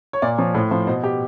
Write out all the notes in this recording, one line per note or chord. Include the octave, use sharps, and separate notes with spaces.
C#5
A#2 D5
F3 C#5
A2 C5
F3 C5
B2 C5
G4